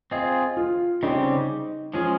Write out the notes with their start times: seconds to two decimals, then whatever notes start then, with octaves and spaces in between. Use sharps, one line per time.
0.11 C4 F4 G#4 D#5
0.57 F4
1.03 C#3 G3 C4 D#4 G4
1.94 F3 G#3 C#4 F4 G#4